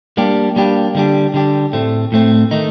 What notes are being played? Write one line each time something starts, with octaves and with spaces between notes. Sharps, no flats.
G3 A#3 D4 G4
G3 A#3 D4 G4
D3 G3 D4 G4
D3 G3 D4 G4
A2 A3 C4
A2 A3 C4
D#3 A3 D#4